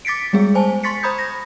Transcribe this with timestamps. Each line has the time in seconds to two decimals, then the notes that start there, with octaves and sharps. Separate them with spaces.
0.05 D6 A6 B6 C#7 D7
0.33 G3 G#3 B3 G#4
0.55 C5 G#5 A5
0.83 C6 C#6 A6 B6 C#7
1.03 C5 A#5 B5 D#6 G6 G#6
1.19 A#6